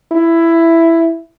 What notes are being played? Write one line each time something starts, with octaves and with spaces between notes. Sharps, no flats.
E4